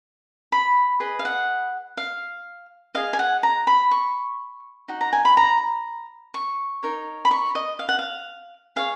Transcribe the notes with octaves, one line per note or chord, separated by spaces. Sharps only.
B5
G#4 B4 D#5
F5
F#5
F5
G#4 D#5 F5
G#5
F#5
A#5
B5
C#6
D#4 F#4
A#5
G#5
B5
A#5
C#6
D#4 A#4 C#5
B5
C#6
D#5
F5
F#5
F5
G#4 C#5 F5